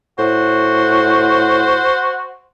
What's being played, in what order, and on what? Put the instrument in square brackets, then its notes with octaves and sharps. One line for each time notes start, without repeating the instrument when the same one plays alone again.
[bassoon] A2 [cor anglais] F#4 [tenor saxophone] C5